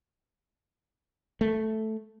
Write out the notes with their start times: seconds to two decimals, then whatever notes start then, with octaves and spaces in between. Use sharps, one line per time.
1.41 A3